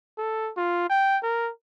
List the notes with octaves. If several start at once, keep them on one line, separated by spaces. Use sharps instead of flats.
A4
F4
G5
A#4